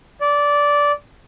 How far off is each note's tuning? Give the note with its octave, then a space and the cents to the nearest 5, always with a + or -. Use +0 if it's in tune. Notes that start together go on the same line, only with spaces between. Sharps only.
D5 -15